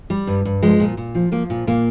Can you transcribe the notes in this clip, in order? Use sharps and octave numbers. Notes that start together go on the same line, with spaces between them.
G3
G2
G2
F3 G#3
A#2
A#2
F3
F3 A#3
A#2
A#2 A#3